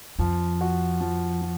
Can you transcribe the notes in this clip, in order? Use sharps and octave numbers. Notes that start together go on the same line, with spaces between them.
F2 F3
F#4
F3
F3